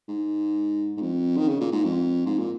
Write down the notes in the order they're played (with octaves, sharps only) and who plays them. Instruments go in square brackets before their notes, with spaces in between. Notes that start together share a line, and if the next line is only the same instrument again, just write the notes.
[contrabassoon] G#2
G#2
F2
D#3
C#3
A#2
G#2
F2
G#2
A#2